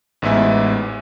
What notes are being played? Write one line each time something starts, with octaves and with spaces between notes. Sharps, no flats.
A1 G#2 B3 E5 G#5